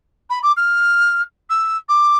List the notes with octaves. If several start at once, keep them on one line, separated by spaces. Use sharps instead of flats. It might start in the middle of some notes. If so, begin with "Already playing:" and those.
B5
D6
F6
E6
D6